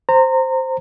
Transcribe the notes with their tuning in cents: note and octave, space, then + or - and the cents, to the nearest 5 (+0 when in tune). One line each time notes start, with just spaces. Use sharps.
C5 +0 A#5 -25